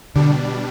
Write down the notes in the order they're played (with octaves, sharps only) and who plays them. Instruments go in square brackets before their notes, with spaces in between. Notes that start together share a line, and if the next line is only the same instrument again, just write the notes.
[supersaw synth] B2 G3 D4 [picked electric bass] D3